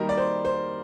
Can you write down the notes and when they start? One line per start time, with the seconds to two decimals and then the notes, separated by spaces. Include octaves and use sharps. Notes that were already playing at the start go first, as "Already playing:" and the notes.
Already playing: D#3 G3 A#3 D#4 A#4
0.09 D5
0.17 C5
0.45 C5